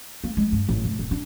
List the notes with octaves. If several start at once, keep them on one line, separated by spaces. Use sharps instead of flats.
A#3
G#3
G2
A1
F1
D#1
D4